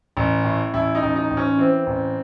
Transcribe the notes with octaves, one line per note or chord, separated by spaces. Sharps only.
A1
A2
A1 E4
D#4
A1
D#4
A1
C#4
E3 C4
A1